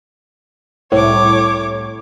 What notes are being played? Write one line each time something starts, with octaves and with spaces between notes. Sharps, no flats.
C2 A2 C#5 D6